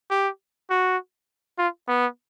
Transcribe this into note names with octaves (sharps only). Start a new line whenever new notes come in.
G4
F#4
F4
B3